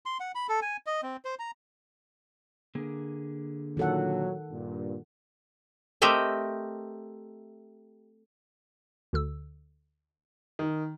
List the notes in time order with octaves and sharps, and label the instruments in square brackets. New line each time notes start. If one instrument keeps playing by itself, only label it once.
[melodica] C6
F#5
B5
A4
G#5
D#5
C4
C5
A#5
[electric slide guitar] D3 A#3 G#4
[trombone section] A#2 F#3 [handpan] D#3 A4 F#5
[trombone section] G2 A#2
[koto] A3 C4 G4 A#4 D#5 E5
[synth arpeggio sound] D2 D3 E6
[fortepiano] D#3